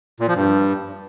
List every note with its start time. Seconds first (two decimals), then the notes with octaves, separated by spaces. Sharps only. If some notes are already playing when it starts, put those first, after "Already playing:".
0.20 A#2
0.28 F3
0.36 G2